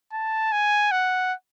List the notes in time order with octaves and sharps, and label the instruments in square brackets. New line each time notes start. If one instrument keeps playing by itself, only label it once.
[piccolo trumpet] A5
G#5
F#5